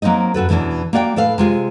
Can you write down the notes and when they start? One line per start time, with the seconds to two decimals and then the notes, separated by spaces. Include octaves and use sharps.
0.02 F#3 A#3 C4 D#4 D#5
0.34 F#2 F#4 A4 B4
0.49 E2 B2 E3 C#4 D4
0.93 A#3 F#4 D5 F#5 G5
1.16 A2 A4 B4 F5
1.38 C3 G#3 F4